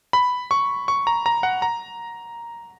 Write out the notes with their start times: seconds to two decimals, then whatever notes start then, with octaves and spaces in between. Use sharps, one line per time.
0.13 B5
0.51 C#6
0.88 C#6
1.07 A#5
1.26 A#5
1.43 F#5
1.62 A#5